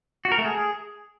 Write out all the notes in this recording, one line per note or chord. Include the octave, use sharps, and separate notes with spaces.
F#4
A#4
A3
G#4